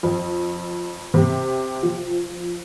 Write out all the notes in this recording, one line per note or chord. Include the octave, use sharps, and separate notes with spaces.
F2
C3
F3